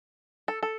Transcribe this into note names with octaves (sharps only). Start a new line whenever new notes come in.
A4
A4